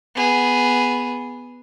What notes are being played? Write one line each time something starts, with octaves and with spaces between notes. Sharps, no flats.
B3 G#4